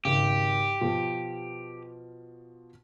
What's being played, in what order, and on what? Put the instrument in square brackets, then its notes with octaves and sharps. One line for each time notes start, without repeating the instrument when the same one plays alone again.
[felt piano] G#1 C#3 [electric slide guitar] G4
[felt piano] B2 F3 F4